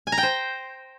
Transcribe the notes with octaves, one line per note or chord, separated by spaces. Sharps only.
G#5
A#5
G5
C5